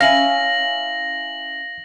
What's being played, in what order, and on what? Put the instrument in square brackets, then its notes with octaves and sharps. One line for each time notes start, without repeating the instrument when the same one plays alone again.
[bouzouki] C#4 E4 G#5 [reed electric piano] F5 [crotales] A#6 F#7